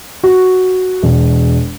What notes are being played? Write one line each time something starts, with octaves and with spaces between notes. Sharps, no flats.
F#4
E1